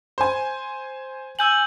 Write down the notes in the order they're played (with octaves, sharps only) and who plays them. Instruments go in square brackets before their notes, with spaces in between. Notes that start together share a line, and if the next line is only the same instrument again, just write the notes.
[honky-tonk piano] C5 G#5
[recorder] G#5 [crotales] E6 G6 F#7